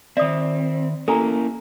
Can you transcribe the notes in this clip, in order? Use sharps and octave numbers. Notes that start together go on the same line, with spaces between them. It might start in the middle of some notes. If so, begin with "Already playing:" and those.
D#3 C4 D5 E5 D#6
A#3 C#4 E4 A4 G#5 A#5